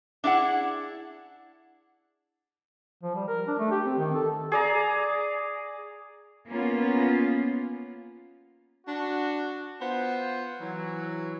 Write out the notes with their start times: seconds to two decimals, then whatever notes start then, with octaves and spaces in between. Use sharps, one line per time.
0.24 D4 E4 G#4 F#5
3.03 F3
3.15 G3
3.28 A#4
3.47 D4
3.59 A3
3.71 G4
3.86 C4
3.98 D#3
4.14 A4
4.52 G#4 D5 A#5
6.48 A#3 B3 C#4 F4
8.87 D4 F#4
9.81 B3 F4 C5
10.61 E3 F#3